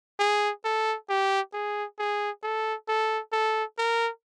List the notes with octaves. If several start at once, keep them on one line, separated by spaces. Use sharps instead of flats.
G#4
A4
G4
G#4
G#4
A4
A4
A4
A#4